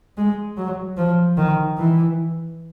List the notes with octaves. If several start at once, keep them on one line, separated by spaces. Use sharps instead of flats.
G#3
F#3
F3
D#3
E3